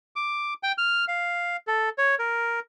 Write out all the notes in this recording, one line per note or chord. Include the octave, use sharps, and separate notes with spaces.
D6
G5
F6
F5
A4
C#5
A#4